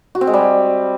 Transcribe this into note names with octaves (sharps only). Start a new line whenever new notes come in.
F#4
C4
G#3
G3